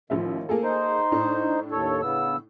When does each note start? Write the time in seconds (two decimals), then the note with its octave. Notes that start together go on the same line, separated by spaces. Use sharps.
0.10 A1 D#2 F3 E5
0.49 A#3 G#4 A4
0.63 D#4 C5
1.12 A2 D4
1.71 D#2 A4 C#5
2.02 C#3 B3 E6